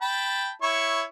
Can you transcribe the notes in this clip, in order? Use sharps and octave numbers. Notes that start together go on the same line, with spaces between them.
G5 A5 B5
E4 C#5 C#6